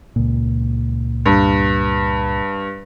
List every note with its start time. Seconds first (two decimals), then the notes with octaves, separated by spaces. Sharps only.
0.16 C#2 A#2
1.25 G2